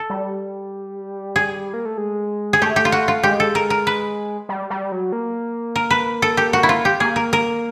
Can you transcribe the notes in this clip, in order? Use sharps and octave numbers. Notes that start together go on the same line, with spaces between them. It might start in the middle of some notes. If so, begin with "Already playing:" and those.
Already playing: A4
G3
G#4
A#3
A3
G#3
G#4
A3 G4
G4
F4
F#4
F4
G#3 G4
A4
A#4
A#4
B4
G3
G3
F#3
A#3
A#4
B4
A4
G4
F#4
E4
F4
G4
A#3 G#4
A#4
A#4